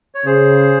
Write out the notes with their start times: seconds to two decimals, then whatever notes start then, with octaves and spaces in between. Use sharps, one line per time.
0.15 C#5
0.26 C#3 G#4 C5